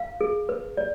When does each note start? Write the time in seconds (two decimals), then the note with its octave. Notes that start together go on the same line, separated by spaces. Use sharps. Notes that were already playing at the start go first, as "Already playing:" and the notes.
Already playing: F5
0.21 G#4
0.49 B4
0.77 D5